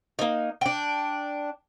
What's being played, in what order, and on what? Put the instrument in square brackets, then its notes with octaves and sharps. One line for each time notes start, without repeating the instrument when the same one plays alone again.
[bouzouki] A#3 D#4
D4 G5